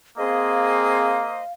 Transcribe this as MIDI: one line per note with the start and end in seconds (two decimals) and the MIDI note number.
0.18 1.41 58
0.18 1.25 60
0.18 1.25 68
0.18 1.42 72
0.18 1.42 75
0.18 1.53 77
0.18 1.42 87